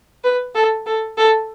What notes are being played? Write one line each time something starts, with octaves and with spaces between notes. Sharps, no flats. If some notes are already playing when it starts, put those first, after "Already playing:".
B4
A4
A4
A4